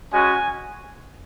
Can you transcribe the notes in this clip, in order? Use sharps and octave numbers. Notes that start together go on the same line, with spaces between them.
G#3 C#4 F#4 G#5